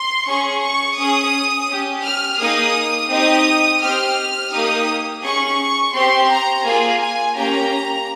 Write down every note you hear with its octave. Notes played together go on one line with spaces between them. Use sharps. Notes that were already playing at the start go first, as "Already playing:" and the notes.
Already playing: C6
C#4 G#4 C#6
C#6
C#4 G#4 D#6
C#4 G4
F6
A#3 D#4 G#4 D#6
C4 D#4 G4 D#6
C4 G4 F6
A#3 D#4 G4 D#6
C#4 G#4 C#6
C4 G4 C6
A#5
A#3 F4 G#4 G#5
G#5
A#3 C#4 G4 A#5